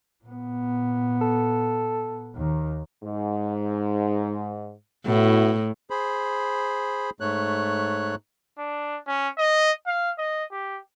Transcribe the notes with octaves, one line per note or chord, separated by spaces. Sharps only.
A#2 B3
A4
D#2 D#3
G#2
A2 B3 E4 F#4
G#4 C5 B5
G#2 A3 C#5 F#6
D4
C#4
D#5
F5
D#5
G4